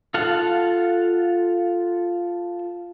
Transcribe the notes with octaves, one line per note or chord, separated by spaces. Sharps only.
F4 A4 F5 F#5 A5